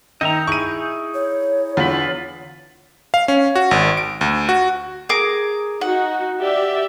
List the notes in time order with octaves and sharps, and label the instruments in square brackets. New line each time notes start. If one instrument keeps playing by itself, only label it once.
[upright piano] D#3 [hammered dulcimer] D#4 [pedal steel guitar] D#5 E5 A#5
[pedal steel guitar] E4 G#4 [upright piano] C#6 D#7
[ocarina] C#5
[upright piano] E2 D3 [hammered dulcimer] F4 B5
[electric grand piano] F5
C#4
F#4
G#1
D7
D2
F#4
[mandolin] G#4 A#4 D6
[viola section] D#4 F#4 [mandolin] F#5
[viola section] G4 D5 E5